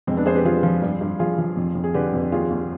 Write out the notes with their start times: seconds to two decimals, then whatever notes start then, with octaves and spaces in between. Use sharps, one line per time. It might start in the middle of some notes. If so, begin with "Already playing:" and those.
0.07 F2 G#3 C4
0.17 B3 D4
0.26 F2 G#4 C5
0.35 G4 B4
0.45 F3 F4 G#4
0.63 F3
0.82 G2
1.01 G2
1.19 F3 F4 G#4
1.38 F3
1.57 F2
1.75 F2
1.84 G#4
1.94 D3 G4 B4
2.14 F2
2.32 D#2 F4 G#4
2.50 D#2